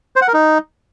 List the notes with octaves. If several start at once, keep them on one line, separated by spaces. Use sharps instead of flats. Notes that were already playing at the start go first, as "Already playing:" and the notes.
C5
F#5
A#4
D#4